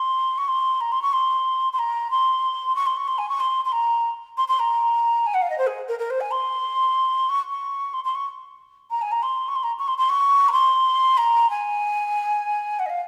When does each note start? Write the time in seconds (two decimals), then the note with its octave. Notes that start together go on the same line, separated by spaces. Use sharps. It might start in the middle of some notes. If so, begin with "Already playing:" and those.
Already playing: C6
0.37 C#6
0.48 C6
0.80 A#5
0.92 C6
1.02 C#6
1.12 C6
1.72 C6
1.78 A#5
2.10 C6
2.75 C#6
2.86 C6
2.96 C#6
3.07 C6
3.18 G#5
3.28 C#6
3.40 C6
3.64 C6
3.71 A#5
4.37 C6
4.47 C6
4.59 A#5
5.26 G#5
5.34 F#5
5.41 F5
5.49 D#5
5.58 C5
5.66 G#4
5.88 A#4
5.98 A#4
6.10 C5
6.20 G#5
6.31 C6
7.29 C#6
7.49 C#6
7.93 C6
8.04 C6
8.14 C#6
8.90 A#5
9.01 G#5
9.11 A#5
9.22 C6
9.48 C#6
9.55 C6
9.63 A#5
9.79 C#6
9.87 C6
9.98 C6
10.09 C#6
10.48 A#5
10.52 C6
11.17 A#5
11.49 G#5
12.79 F#5
12.85 D#5
12.89 F5